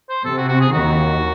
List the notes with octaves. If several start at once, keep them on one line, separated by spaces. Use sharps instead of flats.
C5
C3 A4
F#4
F#4
G#4
D#2 D#3 F#4